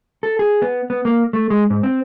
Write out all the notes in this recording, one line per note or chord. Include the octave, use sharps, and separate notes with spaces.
A4
G#4
B3
B3
A#3
A3
G#3
G#2
C4